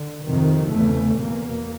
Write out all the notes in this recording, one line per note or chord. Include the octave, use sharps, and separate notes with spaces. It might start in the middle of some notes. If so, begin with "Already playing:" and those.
Already playing: D3
F2 C3 D#3
E2 C#3 A3
E2 B2 A#3